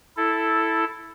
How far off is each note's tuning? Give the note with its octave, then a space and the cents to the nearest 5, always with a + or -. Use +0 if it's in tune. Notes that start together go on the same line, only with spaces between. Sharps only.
E4 +0 A4 +0